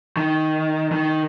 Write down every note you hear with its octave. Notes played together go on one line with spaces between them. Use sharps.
D#3
D#3